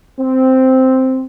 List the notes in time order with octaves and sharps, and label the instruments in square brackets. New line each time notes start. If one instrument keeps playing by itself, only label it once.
[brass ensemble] C4